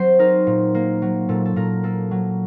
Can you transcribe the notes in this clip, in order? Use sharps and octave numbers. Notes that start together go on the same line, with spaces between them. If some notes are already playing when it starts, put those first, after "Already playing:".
Already playing: F#3 C4 C5
D#4 A#4
A#2
A#3
F#3
A#2 A4
A4
A#2 A#4
A#3 A4
F#3